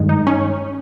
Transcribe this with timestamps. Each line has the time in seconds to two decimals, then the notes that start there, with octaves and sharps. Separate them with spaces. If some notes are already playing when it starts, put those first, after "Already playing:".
Already playing: G2 D#3 G#3
0.09 D#4
0.27 C#4